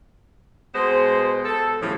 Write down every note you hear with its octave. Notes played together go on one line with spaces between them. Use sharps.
B2 G#3 B3 C5
A4
A2 C#3 E3 F3 G3